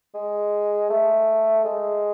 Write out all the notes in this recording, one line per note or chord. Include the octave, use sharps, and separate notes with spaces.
G#3
A3
G#3